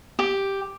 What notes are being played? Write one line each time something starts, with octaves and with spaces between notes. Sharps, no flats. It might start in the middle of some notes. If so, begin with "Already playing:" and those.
G4